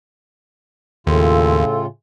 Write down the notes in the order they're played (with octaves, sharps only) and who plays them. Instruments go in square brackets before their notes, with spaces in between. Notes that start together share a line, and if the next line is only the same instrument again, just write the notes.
[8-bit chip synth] D#2 [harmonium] A2 C#3 F4 [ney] A4